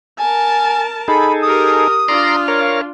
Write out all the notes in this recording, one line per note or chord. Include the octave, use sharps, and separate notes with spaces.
A#4 G#5 A5
D#4 G#4 A4 B5
G4 A#4 D#6
D4 F4 D5 A#5 C6
A#4 C#5 F5